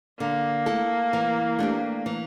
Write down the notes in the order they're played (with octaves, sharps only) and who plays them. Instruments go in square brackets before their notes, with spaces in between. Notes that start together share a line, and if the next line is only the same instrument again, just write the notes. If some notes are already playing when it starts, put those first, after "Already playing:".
[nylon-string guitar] D3 [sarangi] A#3
[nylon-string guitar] A3 E4 A4
E3
A3 D4 G4
E3